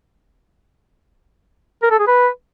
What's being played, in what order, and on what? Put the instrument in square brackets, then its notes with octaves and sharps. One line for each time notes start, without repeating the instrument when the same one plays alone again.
[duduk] A#4
A4
G#4
B4